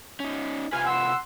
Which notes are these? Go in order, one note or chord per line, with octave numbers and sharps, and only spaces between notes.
C#4 D#4
C3 F4 B4 G#5 F6
F#5 C6 E6